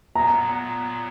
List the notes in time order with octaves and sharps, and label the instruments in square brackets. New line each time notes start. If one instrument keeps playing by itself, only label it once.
[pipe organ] A#2 F#3 B3 [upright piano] A#5